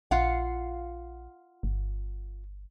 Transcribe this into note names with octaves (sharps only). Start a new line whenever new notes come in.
A#1 F4 F5 F#5
G1